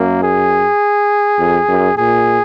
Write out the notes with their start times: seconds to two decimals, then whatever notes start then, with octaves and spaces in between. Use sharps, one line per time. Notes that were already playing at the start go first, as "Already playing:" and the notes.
Already playing: F#2 A#3
0.23 G#4
1.39 F2
1.68 F#2
1.98 A#2 G#4